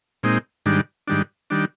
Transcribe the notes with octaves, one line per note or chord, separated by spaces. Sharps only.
A#2 G#3 C4 D#4
G#2 D#3 G3 D4
G#2 D#3 G3 D4
D#3 G3 D4